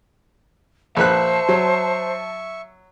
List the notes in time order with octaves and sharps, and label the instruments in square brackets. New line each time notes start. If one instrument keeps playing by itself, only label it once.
[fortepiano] A#1 B4 F#6 [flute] C5 [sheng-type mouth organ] E5 C#6 [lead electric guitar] A5
[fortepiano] F#3